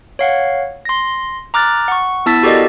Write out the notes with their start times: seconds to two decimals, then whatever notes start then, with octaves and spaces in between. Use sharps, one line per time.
0.19 C#5 F5 F#5
0.85 C6 A#6
1.54 A#5 D6 F6 F#6 A6
1.88 F#5 C#6
2.26 B3 E4 A5 E6 A6 B6
2.43 F#4 G4 A4 A#4 D5 D#5